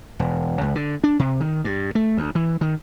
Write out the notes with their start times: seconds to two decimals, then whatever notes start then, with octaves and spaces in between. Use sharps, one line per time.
0.20 E1
0.61 C#2
0.75 D3
1.04 D4
1.19 C3
1.40 D#3
1.64 G2
1.95 A3
2.17 D2
2.35 E3
2.61 D#3